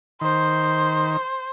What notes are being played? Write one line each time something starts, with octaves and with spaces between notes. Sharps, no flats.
D#3 C5